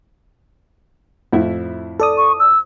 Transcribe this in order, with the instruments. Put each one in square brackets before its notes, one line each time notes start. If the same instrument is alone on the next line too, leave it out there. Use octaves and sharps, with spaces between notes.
[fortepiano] F2 A2 E4
[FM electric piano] A4 D5 D#6
[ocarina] C#6
E6